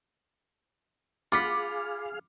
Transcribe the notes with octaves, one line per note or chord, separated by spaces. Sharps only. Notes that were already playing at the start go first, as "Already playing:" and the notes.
F4 G#4 F5 F#5 B5 D6